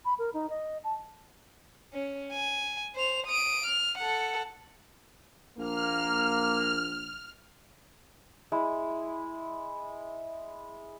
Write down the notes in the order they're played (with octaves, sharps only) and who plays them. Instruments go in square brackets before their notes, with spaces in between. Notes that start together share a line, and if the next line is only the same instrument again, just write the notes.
[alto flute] B5
A#4
D#4
D#5
A5
[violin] C#4
G#5
C5 F7
D#6 D7
F6
A4 F#5
[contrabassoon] A#1 [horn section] A#3 [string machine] F6
[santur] G#3 E4